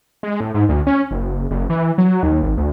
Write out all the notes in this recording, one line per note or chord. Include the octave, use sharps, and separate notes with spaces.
G#3
A2
G#2
D2
C#4
F#1
F#1
E3
F#3
D#2
G#1
D2